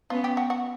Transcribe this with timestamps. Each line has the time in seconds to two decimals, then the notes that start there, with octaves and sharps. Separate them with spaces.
0.10 B3 C#4 F4
0.24 G4
0.37 F#4
0.50 F#4